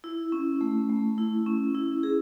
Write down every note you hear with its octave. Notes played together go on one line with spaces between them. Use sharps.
E4
C#4
A3
A3
E4
C#4
E4
G#4